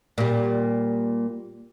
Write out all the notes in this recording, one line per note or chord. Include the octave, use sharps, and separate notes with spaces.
A#2 G3